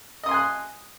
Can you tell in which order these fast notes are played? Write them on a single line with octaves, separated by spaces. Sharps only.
D#5 D#6 C6 G#5 F#6